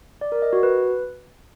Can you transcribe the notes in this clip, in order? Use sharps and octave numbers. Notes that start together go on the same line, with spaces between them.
D5
A#4
D#5
F#4
B4